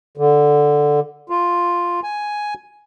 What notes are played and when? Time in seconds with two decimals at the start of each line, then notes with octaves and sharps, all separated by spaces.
0.18 D3
1.30 F4
2.04 G#5